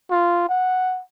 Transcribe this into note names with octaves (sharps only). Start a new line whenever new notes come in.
F4
F#5